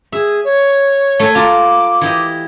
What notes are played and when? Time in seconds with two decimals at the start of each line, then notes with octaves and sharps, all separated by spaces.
0.12 G#4 E5
0.44 C#5
1.19 A3 A4 G#5
1.35 F4 A5 A#5 D6
2.01 E3 G4 D#5